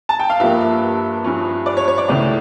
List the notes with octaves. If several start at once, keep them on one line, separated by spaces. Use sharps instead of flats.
A5
G5
F5
G2 F3 A#3 E5
E5
G2 F3 C#4
D5
C#5
C#5
D5
C#2 C#3 E3 A3 D5